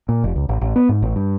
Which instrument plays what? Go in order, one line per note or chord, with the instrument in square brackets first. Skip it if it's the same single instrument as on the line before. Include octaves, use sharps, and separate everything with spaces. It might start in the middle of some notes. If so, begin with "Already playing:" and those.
[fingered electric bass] A#2
F1
C#2
A1
A1
B3
G#2
A1
G2